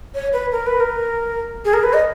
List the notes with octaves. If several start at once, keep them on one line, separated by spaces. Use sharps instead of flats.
C#5
B4
A#4
B4
A#4
G#4
A#4
B4
D#5